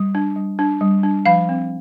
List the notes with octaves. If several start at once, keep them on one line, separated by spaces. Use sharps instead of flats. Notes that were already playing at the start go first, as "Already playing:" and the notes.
Already playing: G3
D4
G3
D4
G3
D4
F3 F5
C4